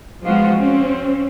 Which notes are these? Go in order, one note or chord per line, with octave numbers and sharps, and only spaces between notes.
F3 G#3 B3 F4 F#4
C4 C#4